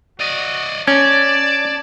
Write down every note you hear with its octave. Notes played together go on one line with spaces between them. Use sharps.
F#4 D5 D#5
C#4 D5 A5 G#6